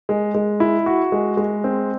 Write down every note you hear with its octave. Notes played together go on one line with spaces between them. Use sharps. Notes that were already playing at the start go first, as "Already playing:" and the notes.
G#3
G#3
E4
F#4
G#3
G#3
C4